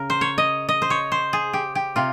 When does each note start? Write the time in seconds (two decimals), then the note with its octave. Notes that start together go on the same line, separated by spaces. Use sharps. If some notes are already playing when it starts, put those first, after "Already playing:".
Already playing: C#3 A#4
0.10 C5
0.21 C#5
0.38 D#5
0.69 D#5
0.82 C5
0.90 C#5
1.12 C5
1.33 G#4
1.53 G4
1.75 G4
1.96 C3 F4